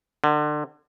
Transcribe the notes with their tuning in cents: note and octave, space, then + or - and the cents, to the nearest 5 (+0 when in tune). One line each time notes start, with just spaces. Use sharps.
D3 +30